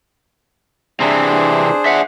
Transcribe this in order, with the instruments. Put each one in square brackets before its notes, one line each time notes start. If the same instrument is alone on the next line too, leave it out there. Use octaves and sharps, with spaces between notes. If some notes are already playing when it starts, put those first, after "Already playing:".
[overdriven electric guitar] C3 E3 [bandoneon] D4 G#4 C5
[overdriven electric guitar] E5 F#5